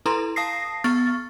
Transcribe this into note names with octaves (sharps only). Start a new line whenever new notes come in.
E4 A4 B4 A#5 C6
F5 A5 D#6 A#6 C7
B3 C#6 F6 A6